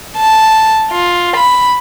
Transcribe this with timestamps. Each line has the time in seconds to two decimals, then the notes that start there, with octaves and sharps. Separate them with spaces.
0.17 A5
0.91 F4
1.36 B5